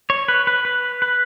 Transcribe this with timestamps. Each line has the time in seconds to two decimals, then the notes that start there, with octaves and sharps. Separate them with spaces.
0.10 C#5
0.28 B4
0.47 B4
0.65 B4
1.02 B4